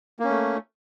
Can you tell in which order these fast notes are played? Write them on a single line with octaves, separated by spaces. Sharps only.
A#3 C#4 A3